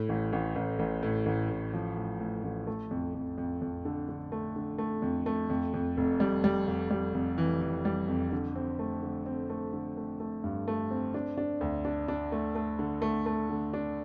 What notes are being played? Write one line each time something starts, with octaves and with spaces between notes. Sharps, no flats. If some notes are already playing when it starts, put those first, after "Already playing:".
Already playing: A2
A1
A1
A1
A1
A2
A1
A2
F3
A2
A2
A1
A3
F2
F2
F2
F2
D3
D3
A3
D3
A3
F2
A3
F2
F2
F1
G3
G3
F1
G3
F1
E3
E3
G3
F2
D3
C4
A3
D3
C4
A3
D3
A3
A3
G2
A3
C4
D4
D4
D2
D4
D4
A3
A3
D3
A3
A3
D3
D4